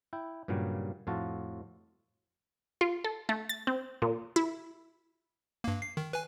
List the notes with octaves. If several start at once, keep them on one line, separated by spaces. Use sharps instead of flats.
E4 G5
G2 A#2 C#3 F#3 G3
F2 A2 F4 F#4 A5
F4
A4
A3
A6
C4
A#2
E4
G2 A#3
C7
D#3
B4 G#5